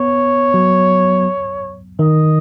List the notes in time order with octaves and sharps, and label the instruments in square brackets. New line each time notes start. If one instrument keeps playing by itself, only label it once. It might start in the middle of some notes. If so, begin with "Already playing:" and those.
Already playing: [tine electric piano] B3 [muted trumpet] C#5
[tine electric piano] F#3
[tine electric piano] D#3 [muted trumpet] D#5